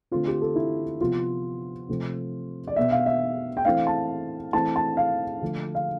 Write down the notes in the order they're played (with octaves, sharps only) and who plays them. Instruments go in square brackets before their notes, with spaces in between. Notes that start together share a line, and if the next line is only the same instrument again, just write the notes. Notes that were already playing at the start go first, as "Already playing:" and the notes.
[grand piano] D3 A3 C4 F4
G4
A4
E4
C3 F3 B3 F4
C3 F3 A3 C4
D5
B2 B3 E5
F5
E5
G5
E3 A3 C4 F5
A5
E3 A3 C4 A5
A5
F5
D3 F3 A3
F5